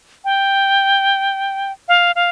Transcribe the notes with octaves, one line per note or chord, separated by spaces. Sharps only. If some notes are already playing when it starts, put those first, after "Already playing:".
G5
F5
F5